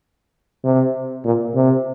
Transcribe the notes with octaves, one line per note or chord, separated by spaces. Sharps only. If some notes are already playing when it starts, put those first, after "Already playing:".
C3
A#2
C3